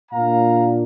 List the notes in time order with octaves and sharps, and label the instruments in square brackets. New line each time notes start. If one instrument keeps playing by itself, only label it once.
[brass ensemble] A#2 A#3 D4 F5 A#5